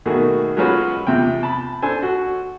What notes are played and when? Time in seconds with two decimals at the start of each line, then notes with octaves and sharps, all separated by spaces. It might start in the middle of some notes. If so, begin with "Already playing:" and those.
0.06 B2 D#3 A3 A#3 F#4 G#4
0.57 F#3 G#3 C#4 F4 F#4 B4
1.07 E2 C3 F3 G5
1.43 A5 B5
1.82 D4 A4 C5 G#5
2.03 F#4